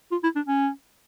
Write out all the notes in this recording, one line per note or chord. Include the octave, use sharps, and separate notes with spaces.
F4
E4
D4
C#4